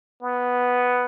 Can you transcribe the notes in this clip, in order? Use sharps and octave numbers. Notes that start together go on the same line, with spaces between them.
B3